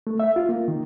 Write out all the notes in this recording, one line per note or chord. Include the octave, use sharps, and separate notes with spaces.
A3
E5
F4
A#3
D#3